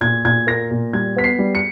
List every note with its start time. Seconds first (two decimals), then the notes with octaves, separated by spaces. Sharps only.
0.01 A#2 G#6
0.25 A#2 G#6
0.47 A#3 A#6
0.71 A#2
0.93 G3 G#6
1.16 B3 B6
1.24 C7
1.39 G3
1.55 C#7